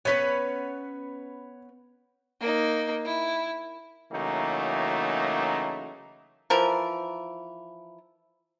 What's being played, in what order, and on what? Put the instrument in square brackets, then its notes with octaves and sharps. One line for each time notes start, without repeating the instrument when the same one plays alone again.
[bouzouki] B3 C#4 B4 [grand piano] C#5 B6
[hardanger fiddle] A#3 D#4
E4
[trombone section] C#3 E3 F#3 A3 A#3 D#4
[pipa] E3 F3 A#4